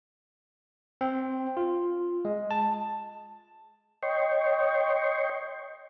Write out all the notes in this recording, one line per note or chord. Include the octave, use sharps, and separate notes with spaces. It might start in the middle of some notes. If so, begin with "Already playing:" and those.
C4
F4
G#3
A5
C#5 D#5 G5 C6 C#6